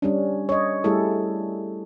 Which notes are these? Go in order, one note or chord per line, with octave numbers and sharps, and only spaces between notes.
G3 C#4 D4
C#5 D#5
G3 A3 E4 G#4 A4